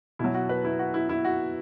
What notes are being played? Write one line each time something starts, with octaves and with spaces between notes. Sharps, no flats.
B2 F#3 E4
F#4
B4
E4
F#4
E4
E4
F#4